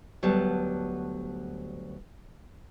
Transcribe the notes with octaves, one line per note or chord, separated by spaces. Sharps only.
D2 F#3 G3 B3 A5